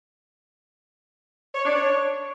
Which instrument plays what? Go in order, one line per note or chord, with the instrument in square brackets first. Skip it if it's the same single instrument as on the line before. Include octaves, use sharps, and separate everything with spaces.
[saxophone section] C#5
D4
C#5